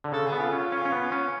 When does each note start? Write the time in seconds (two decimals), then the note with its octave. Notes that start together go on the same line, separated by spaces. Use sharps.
0.04 D3
0.12 C#3 A4
0.27 G#4
0.32 B3
0.39 F4
0.53 C#4
0.72 C#4
0.85 C#4
0.92 B3
1.12 C#4